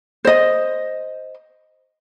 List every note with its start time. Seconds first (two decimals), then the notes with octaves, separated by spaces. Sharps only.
0.25 C5 D#5